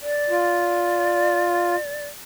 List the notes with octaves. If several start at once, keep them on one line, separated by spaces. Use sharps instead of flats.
D5
F4